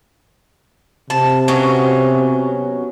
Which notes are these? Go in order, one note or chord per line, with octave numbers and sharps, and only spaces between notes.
C3 A5
B2 F#3 C#4